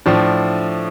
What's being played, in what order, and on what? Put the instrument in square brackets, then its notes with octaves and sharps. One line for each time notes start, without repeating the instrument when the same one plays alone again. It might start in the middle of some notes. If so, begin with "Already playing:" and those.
[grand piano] A2 F3 D4